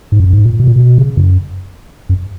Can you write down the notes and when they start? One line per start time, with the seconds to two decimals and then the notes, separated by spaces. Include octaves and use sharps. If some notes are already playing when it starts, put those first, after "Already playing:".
0.12 G#2
0.20 F#2
0.33 G#2
0.46 A#2
0.60 B2
0.67 A#2
0.76 B2
0.98 C#3
1.17 F#2
2.09 F#2